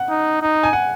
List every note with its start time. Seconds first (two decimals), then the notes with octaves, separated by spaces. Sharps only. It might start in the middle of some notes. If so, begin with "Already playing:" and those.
Already playing: F#5
0.09 D#4
0.41 D#4
0.63 G#5
0.73 F#5